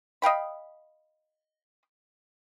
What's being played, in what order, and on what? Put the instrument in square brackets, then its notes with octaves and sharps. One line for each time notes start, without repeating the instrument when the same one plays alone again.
[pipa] D#5 F5 G5 B5